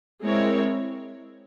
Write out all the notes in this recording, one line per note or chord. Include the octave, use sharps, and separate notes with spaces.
G#3 C4 E4 A#4 C#5